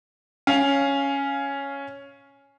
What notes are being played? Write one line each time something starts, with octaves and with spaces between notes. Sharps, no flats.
C#4 F5